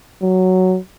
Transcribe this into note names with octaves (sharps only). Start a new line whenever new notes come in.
F#3